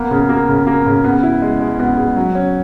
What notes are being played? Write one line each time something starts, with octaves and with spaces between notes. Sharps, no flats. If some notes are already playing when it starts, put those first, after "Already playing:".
Already playing: A#3 B3
C#3
A#3
C#3
A#3
C#3
B3
E4
G#3
G#3
B3
G#3
F#3
C#4